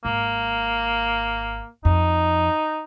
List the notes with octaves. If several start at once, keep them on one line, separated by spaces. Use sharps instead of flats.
G#1 A#3
F2 D#4